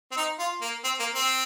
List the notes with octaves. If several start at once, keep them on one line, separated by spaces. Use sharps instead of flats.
C4
D#4
F4
A#3
C4
A#3
C4